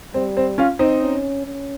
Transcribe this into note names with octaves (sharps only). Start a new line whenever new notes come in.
G3 C4
C4
C#4 F4
C4 D#4
C#4
C#4